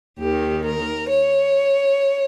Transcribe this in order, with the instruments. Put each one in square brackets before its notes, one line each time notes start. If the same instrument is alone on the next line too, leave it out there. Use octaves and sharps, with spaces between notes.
[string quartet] D#2 D#3 G4
A#4
C#5